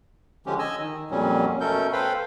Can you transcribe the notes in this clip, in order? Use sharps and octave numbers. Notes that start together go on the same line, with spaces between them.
D3 F3 G#3 C#4 G4
D#5 G#5 E6
D#3
F2 A#2 F#3 G3 C#4
B2 A3 C#4 A4 A#4 G6
A4 B4 C5 F5 G5 B5